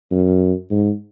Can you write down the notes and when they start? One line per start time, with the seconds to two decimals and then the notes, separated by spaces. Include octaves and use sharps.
0.11 F#2
0.71 G#2